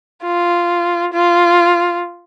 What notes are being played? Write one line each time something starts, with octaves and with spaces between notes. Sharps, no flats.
F4
F4